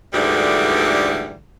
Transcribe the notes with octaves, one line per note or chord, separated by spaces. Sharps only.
D2 G#2 D3 E3 G3